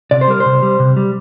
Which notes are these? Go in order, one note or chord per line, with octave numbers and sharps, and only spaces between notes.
C3 D5
C5
G3 A#4
C5
C3
G3
C3
G3